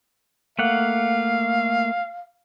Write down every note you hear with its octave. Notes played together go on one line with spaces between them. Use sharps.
A3 A#3 F5 F#5